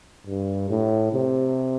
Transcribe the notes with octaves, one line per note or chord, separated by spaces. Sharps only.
G2
A2
C3